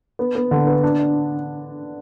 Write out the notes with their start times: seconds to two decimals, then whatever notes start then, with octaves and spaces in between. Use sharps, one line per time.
0.19 B3
0.35 B3
0.51 D3
0.67 B3
0.83 D4
0.99 D4